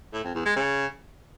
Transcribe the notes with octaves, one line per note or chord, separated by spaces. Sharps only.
A2
F2
E2
G#3
C#3